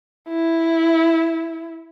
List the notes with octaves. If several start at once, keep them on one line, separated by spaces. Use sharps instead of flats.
E4